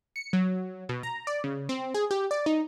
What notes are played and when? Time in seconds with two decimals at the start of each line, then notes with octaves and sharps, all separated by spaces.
0.16 C#7
0.33 F#3
0.89 B2
1.03 A#5
1.27 D5
1.44 C#3
1.69 C4
1.94 G#4
2.11 G4
2.31 D5
2.46 D#4